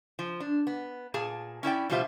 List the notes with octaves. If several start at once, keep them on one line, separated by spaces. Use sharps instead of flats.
F3
D4
B3
A#2 G#4 A5
C#4 E4 D5 G5
B2 F3 G3 F4 C5 E5